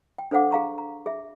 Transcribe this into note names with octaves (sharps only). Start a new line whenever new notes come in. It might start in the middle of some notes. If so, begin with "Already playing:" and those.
G5
D4 A4 C5 F5 F#5 D6
G#4 F5 A#5 C#6
A#5
G#4 E5